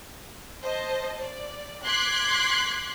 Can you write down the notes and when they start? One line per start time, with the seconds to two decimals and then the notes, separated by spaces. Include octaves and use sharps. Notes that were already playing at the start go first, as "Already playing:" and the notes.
0.62 C5 D#5 A5
1.23 D5
1.84 C6 D6 F#6 G#6 B6 C7